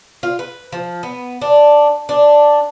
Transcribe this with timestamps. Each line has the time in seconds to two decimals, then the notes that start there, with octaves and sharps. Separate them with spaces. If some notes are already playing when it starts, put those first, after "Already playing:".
0.23 F4
0.39 B4
0.72 F3
1.03 B3
1.41 D4
2.09 D4